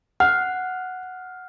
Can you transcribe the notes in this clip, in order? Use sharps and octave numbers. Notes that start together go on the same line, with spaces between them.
F#5 F6